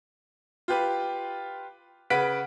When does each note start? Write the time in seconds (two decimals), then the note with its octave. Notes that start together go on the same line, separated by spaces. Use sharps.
0.68 F4 G4 B4
2.10 C#3 B4 F#5 B6 D7